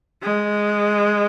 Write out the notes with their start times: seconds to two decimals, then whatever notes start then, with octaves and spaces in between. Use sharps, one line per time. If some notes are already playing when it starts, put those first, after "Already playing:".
0.23 G#3